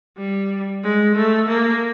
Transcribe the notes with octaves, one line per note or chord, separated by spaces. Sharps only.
G3
G#3
A3
A#3